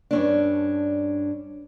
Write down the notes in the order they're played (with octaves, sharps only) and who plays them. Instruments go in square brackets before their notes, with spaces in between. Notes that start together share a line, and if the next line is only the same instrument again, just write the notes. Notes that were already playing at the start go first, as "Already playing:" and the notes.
[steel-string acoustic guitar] G2 C#4 D4